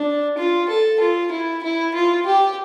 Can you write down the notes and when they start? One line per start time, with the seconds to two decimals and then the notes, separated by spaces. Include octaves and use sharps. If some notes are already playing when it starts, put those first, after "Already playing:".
Already playing: D4
0.38 F4
0.69 A4
1.00 F4
1.31 E4
1.63 E4
1.94 F4
2.26 G4